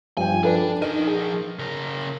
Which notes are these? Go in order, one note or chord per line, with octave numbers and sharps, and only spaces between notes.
G2 F3 G5 G#5
D4 A4 B4 D5
F3 D#4 A#4 D#7
G#4
C#3 A#4